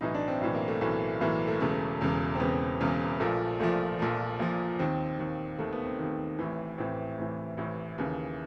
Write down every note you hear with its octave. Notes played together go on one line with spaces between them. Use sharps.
B1 A2 E3 D#4
D4
C4
B1 A2 E3
A#3
A3
B1 A2 E3 A3
B1 A2 E3 A#3
A3
E1 E2 C#3 A3
E1 E2 C#3
C4
E1 E2 C#3 B3
E1 E2 C#3
A#1 A#2 F3 A3
A#1 A#2 F3 A3
A#1 A#2 F3
A#1 A#2 F3 A#3
D#2 D#3 C4
D#2 D#3
D#2 D#3 A3
B3
C4
D#2 D#3 C4
A1 A2 E3
A1 A2 E3 C4
A1 A2 E3
A1 A2 E3
D#2 C#3 E3